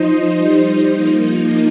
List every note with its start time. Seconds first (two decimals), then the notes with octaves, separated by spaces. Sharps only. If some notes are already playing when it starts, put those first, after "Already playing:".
Already playing: F3 D#4 C5 D#5
0.37 G3 D#4 C5
0.93 F3 A#3 D#4